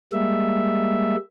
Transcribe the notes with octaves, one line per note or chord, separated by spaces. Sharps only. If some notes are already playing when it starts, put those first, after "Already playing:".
G3 G#3 A#3 E5